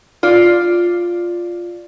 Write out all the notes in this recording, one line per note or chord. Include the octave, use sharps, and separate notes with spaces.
F4 D5